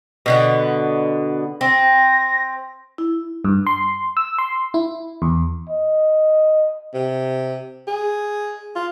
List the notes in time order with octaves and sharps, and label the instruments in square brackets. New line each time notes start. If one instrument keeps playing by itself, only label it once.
[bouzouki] B2 D3 B3
[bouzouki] C4 [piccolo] A#6
[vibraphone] E4
[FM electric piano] G2
C6
E6
C6
E4
E2
[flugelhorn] D#5
[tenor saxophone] C3
G#4
F4